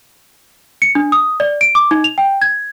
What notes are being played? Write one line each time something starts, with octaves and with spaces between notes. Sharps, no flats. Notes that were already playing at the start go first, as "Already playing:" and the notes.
C#7
D4
D#6
D5
D7
D6
D#4
F7
G5
G#6